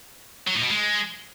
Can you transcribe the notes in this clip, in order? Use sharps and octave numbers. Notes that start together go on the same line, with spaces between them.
F#3
A2
B2
G#3